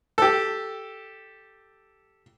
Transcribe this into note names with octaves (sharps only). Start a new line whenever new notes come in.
G4 A4